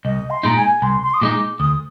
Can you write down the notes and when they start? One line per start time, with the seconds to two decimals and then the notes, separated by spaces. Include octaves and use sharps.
0.05 C2 D#5
0.30 C6
0.43 A#2 G#3 D#4 A#5
0.57 G#5
0.82 C2 C6
1.02 C6
1.14 D#6
1.21 A#2 G#3 D#4 D6
1.59 D2 D#6